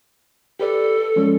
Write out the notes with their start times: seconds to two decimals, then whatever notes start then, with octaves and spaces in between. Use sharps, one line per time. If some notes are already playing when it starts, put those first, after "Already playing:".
0.60 G4 A4 B4 D5
1.16 F3 G#3 C#4